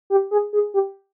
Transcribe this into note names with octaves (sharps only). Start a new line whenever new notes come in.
G4
G#4
G#4
G4